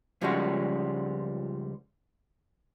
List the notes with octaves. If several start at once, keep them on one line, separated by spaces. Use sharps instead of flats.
C#2 F3 G3 G#3 C#4 F#4